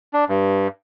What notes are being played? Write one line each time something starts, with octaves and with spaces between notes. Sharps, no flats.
D4
G2